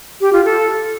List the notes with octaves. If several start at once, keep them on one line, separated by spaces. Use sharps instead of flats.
G4
F4
A4